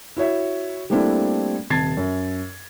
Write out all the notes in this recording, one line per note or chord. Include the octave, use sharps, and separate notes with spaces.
E4 F#4 C#5 E5
G3 A3 A#3 C4 D4 E4
D#1 C3 A5 G#6 A6 C7
F#2